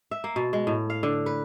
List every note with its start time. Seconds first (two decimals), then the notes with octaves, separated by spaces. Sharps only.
0.11 E5
0.24 A#3
0.36 B2
0.53 G#3
0.67 A2
0.90 F5
1.03 D3
1.26 B4